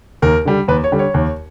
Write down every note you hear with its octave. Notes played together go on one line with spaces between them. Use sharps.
D#2 A#4
D3 G3
D#2 B4
C#5
D3 G3
C#5
D#2